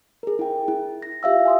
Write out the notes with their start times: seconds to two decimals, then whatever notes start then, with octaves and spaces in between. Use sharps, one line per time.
0.23 G#4 A#4
0.39 E4 G5
0.68 E4
1.02 A#6
1.23 F4 G4 E5 F5 E6
1.46 G#5 C6 D#6